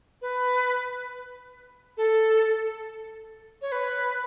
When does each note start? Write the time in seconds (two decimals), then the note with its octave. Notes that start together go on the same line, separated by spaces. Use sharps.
0.21 B4
1.97 A4
3.62 C#5
3.72 B4